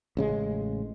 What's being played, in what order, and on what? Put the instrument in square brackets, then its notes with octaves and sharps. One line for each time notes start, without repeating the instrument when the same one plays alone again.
[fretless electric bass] A1 C#3 G#3